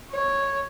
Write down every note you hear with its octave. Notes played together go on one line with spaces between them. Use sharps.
C#5